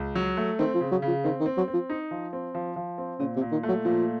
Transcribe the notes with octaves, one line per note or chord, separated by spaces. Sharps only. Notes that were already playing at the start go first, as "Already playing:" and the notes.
Already playing: C#2
F#3
A3
D#3 C4
F3
C#3
F#3
C#3 F3
D#3 C4
D#3
C4
F#3
C4
F3
D#4
F3
C4
F3
F3
C4
A#2 C#3
C3
A#2
D#3
A3
F#3
A#2 F3